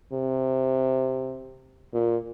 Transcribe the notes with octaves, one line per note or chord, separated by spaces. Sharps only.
C3
A#2